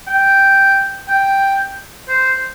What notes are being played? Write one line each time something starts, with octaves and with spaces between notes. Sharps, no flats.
G5
G5
C5